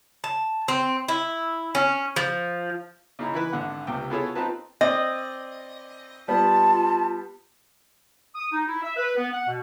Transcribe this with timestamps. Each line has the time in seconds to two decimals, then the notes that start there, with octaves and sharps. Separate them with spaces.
0.24 A5
0.68 C4
1.08 E4
1.75 C#4
2.16 F3
3.19 C#3 D#4 E4
3.34 E3 E4 B4
3.52 G#1 D3 F#5
3.87 C#2 C3 G5
4.10 B3 E4 F4 G#4 A4 C#5
4.35 C4 D#4 F4 B4 A5
4.81 C4 D5 D#5
6.28 G3 B3 F4 A5
8.36 D#6
8.52 D#4
8.67 E4
8.82 E5
8.97 B4
9.16 B3
9.32 F#5
9.48 B2